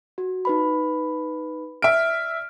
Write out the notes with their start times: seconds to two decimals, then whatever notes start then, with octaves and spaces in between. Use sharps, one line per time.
0.18 F#4
0.45 D#4 B4 B5
1.82 D5 E5 F6 D7